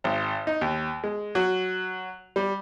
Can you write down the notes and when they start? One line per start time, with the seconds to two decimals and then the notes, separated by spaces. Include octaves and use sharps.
0.04 G#1
0.47 D#4
0.61 D#2
1.04 G#3
1.35 F#3
2.36 G3